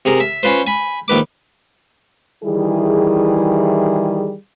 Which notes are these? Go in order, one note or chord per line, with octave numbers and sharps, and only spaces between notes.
C3 G#4 A#4
E5
C#4 F4 B4 C5
G#5 B5
A#1 D#3 B4 D6
D#3 E3 G3 E4 G#4